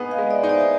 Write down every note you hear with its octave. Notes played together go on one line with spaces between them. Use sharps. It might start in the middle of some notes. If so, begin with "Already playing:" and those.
Already playing: B3 D#4 G#4
D#5 F5
G#3
D5 E5
D#4
C5 D5